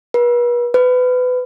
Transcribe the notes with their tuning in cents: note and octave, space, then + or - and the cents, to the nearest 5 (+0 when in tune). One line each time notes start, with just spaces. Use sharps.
B4 -40
B4 +25